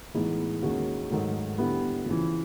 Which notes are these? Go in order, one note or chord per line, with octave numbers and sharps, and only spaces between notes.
A2 E3 G#3 B3 D#4
D#2 D#3 G#3 C#4 F#4
G#2 D#3 F#3 A3
D3 G3 B3 E4
F2 C#3 E3